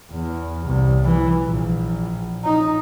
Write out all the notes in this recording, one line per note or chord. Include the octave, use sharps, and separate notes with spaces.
E2
C2
E3
A#1
D#4